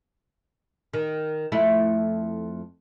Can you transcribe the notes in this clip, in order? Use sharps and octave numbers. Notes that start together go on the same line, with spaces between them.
D#3
F2 A3 E4